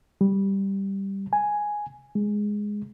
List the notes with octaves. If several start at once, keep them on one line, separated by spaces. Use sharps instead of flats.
G3
G#5
G#3